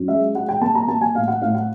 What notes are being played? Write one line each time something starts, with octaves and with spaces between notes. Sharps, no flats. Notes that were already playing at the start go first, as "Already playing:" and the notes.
Already playing: F#2
G#3 E5
G#3 F#5
G5
A#3 A5
A#5
A#3 A5
G#5
A2 F5
F#5
A2 F5
F#5